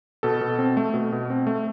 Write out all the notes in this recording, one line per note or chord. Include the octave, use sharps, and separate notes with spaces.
B2 A4
B2
C4
A3
B2
B2
C4
A3